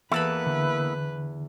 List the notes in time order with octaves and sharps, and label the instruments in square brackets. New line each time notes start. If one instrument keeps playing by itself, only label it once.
[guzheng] E2 A5 B5 [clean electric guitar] A#3 B3 E4 [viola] B4
[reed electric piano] D3